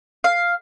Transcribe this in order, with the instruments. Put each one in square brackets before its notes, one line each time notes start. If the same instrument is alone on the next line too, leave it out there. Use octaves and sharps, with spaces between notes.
[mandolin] F5